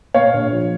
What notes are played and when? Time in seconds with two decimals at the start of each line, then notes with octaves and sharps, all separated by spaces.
0.14 A#2 C#5 F5
0.34 A#1
0.52 F3